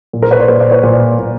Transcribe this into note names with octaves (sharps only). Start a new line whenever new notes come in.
A#2
A#4 C5
B4 C#5
C5 D5
A#2 B4 C#5
C5 D5
B4 C#5
A#2 C5 D5
A#2